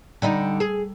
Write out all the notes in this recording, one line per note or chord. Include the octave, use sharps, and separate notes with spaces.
D3 G3 D#4
G#4